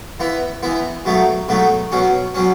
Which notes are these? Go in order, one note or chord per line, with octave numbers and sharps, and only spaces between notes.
E3 B3 E4
E3 B3 E4
B2 F#3 A3 D#4
B2 F#3 A3 D#4
B2 F#3 C#4
B2 F#3 C#4